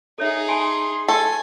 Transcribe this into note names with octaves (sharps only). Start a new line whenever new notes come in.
D#4 G#4 A4 C#5 E5
G#5 A5 B5 C6
A4 G#5 C#6